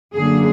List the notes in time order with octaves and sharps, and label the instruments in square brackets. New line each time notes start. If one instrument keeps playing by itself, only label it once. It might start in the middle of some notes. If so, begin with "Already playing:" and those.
[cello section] F#2 D3 F#3 A#3 G#4